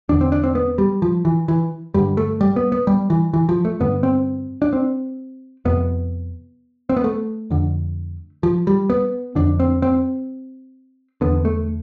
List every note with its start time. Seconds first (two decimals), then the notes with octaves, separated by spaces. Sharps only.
0.09 E2 D3 D4
0.21 C4
0.32 D4
0.44 C4
0.55 B3
0.78 G3
1.02 F3
1.25 E3
1.48 E3
1.94 G2 D3 G3
2.17 A3
2.41 G3
2.56 B3
2.72 B3
2.87 G3
3.10 E3
3.33 E3
3.49 F3
3.65 A3
3.80 G2 D3 B3
4.03 C4
4.62 D4
4.73 C4
5.65 F2 C3 B3
6.89 C4
6.97 B3
7.04 A3
7.50 F2 D3
8.43 F3
8.67 G3
8.90 B3
9.35 F2 D3 D4
9.60 C4
9.82 C4
11.21 E2 D3 B3
11.45 A3